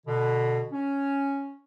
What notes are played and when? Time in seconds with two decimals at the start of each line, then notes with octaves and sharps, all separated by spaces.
0.07 B2 D3
0.71 C#4